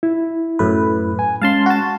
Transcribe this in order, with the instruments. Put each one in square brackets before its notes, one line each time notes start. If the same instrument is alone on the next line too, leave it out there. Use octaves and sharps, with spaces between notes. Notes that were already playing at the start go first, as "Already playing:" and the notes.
[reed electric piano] E4
[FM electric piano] F#2 A2 B4
[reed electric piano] G#5
[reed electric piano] G#3 C#4 [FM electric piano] F5 A5 C6
[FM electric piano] F#4 A5